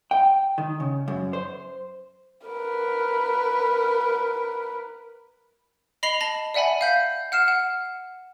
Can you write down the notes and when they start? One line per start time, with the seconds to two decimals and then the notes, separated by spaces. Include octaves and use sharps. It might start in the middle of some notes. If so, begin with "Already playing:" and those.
0.11 G5
0.58 D#3
0.80 C#3
1.08 F#2
1.33 C5
2.47 A#4 B4
6.03 D#5 B5 A#6 C7 F7 G7
6.21 A5 A#6 F#7
6.54 D5 E5 F#5 G#5 B5
6.81 F5 G6 B6
7.32 F#5 F6 C7 E7
7.48 F#5